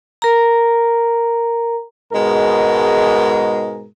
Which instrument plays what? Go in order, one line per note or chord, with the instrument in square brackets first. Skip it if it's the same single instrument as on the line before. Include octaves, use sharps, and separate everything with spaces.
[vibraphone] A#4 A#5
[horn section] G#2 B2 G#3 A#4